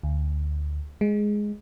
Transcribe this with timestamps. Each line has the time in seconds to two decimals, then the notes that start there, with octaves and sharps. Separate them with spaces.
0.03 D2
1.01 G#3